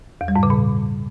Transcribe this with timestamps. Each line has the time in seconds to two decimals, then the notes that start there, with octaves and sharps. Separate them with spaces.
0.21 E2
0.28 G3
0.36 G#2
0.43 C#3
0.50 A#2